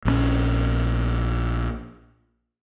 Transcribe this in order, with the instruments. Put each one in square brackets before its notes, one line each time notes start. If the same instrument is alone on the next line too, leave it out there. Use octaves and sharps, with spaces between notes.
[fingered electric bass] A#1 D3 C#4